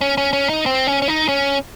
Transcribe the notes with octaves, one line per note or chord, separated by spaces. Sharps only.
C#4
C#4
C#4
D#4
C4
C#4
C#4
D#4
C#4